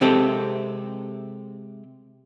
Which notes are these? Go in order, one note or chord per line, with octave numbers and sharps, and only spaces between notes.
C3 G#3 C4 G4 A4